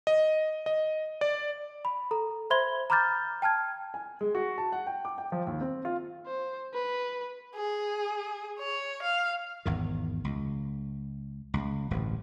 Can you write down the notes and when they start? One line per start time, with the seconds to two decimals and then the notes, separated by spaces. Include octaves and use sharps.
0.07 D#5
0.66 D#5
1.21 D5
1.85 B5
2.11 A4 A#5
2.50 C5 E5 B5 C6 G#6 G7
2.90 A#5 B5 D6 F6 G6 A6
3.42 G5 A5 F6 G#6
3.94 G#5
4.21 G#3
4.35 F#4
4.58 A5
4.72 F#5
4.87 G5
5.05 D6
5.18 G5
5.32 F3
5.47 D#2
5.61 C4
5.85 F4
6.27 C5
6.74 B4
7.56 G#4
8.59 C#5
9.02 F5
9.66 G#1 E2 D#3
10.24 C#2
11.54 C#2
11.91 D1 A1 G2